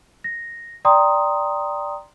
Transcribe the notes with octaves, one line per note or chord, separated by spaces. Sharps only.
A#6
D5 G5 A#5 C6 D#6